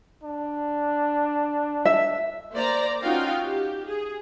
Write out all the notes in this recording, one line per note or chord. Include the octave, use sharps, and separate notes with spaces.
D4
E5
A#3 C5 D5 A#5
C#4 D#4 F4 F#4 F5 G5
G4
G#4